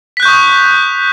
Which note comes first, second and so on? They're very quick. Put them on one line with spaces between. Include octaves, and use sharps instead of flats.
B6 F#6 G6 C#6 D#6